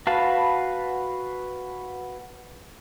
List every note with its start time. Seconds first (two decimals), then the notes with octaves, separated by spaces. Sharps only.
0.07 F#4 B4 F5 A5 B5